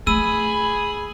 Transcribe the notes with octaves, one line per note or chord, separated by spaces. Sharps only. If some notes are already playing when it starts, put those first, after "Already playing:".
A3 G#4 B5 E6 D#7